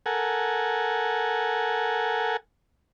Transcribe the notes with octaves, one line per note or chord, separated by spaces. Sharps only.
A4 A#4 F#5 G#5